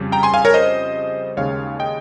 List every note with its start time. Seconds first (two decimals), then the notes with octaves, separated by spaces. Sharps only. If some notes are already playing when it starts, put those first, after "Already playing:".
Already playing: F2 C#3 G3 C#4
0.12 G5 A#5
0.23 G#5 C6
0.34 F5 G#5
0.45 A#4 C#5
0.54 C5 D#5
1.37 D#2 C#3 G#3 C#5 F5
1.79 D#5 G5